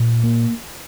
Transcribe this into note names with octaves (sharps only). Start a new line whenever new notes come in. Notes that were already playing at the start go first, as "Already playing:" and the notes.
Already playing: A#2
A#3